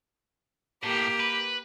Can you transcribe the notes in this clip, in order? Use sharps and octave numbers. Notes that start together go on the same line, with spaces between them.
A2 A#3 G4
B4